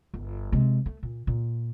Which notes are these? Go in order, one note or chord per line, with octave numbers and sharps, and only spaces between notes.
G1
C3 G#3
A3
A#2
A#2